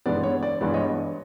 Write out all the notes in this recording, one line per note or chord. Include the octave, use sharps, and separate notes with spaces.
G2 E3 G#3 B3 D5
C#5
D5
G2 E3 G#3 B3 D5
C#5 D#5